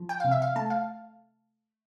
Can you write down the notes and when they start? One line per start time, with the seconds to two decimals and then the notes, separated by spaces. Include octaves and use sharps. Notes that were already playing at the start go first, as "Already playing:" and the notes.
Already playing: F3
0.09 G5
0.20 C3 F5
0.31 E5
0.42 F5
0.56 A3 A5
0.70 F5